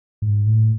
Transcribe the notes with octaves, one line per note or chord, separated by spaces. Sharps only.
G#2
A2